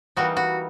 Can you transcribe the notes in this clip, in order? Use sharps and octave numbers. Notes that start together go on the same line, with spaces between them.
E3 G3 A#3 D#4 F#4
F#4